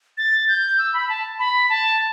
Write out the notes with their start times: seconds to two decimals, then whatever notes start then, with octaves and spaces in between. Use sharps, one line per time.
0.18 A6
0.49 G6
0.79 E6
0.94 B5
1.09 A5
1.39 B5
1.70 A5